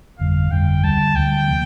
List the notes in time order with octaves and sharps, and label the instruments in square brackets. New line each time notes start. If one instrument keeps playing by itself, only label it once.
[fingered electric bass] G1 F2 D3 G3 [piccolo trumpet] F5
[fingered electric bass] G1 F2 D3 G3 [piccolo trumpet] G5
[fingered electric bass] D2 D3 G3 [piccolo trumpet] A5
[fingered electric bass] D2 D3 G3 [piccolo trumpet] G5
[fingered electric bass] C3 F3 A#3